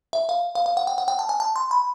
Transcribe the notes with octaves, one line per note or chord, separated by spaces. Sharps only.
E5
F5
F5
F5
F#5
G5
F#5
G5
A5
G#5
A5
C6
B5